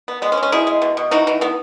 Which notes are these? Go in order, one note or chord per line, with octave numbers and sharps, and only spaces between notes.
B3
G#3 B3
C#4
G#3
C#4
B2 E4 G#4
G#3
B2
B2
E3 D#4 F#4
E3
E3 B3